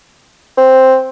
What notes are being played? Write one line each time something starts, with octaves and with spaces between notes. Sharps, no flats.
C4